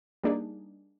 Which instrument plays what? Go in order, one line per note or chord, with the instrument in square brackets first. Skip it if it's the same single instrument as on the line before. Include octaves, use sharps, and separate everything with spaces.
[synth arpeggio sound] G3 A#3 D4 D#4 G#4